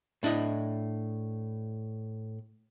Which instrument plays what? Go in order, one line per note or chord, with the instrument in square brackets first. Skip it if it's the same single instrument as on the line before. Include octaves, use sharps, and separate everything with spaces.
[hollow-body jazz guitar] A2 D4 E4 D#5